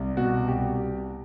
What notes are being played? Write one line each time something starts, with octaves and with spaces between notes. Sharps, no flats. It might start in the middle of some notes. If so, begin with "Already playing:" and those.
Already playing: C2
B2 F#4
C2 G4